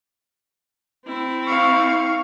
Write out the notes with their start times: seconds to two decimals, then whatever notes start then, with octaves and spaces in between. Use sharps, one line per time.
1.06 C4 E4
1.46 F5 C#6